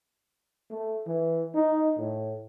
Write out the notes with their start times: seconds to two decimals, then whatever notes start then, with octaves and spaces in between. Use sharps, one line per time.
0.71 A3
1.07 E3
1.55 D#4
1.99 A2